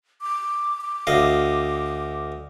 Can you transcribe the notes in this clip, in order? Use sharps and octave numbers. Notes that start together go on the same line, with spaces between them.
D6
D6
D2 D#5 F5